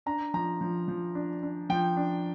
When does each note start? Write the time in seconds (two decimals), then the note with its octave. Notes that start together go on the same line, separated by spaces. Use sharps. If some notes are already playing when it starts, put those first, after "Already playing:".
0.06 D4 A#5
0.34 F3 A#5
0.61 F3
0.88 F3
1.15 D4
1.43 D4
1.70 F3 G5
1.97 D4